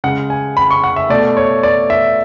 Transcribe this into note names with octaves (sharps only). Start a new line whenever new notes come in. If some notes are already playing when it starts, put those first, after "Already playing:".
C#3 G#3 F#5
G#5
B5
C#6
F#5
E5
B2 A3 D5
C#5
D5
E5